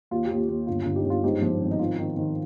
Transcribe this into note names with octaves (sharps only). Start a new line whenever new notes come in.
D#2 F4
G4
D#2
F4
D#2
G1 F4
G1 F4
D#4 G4
G1 F4
G#2 D#4 G4
F3
G#1
D#4
D#3 F4
D#3
D#3